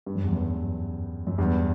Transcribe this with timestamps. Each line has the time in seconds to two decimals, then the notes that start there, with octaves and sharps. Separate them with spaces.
0.06 G2
0.15 F#2
0.24 E2
0.32 F#2
1.27 F#2
1.38 E2 G2